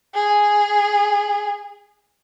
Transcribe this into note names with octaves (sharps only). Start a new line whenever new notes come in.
G#4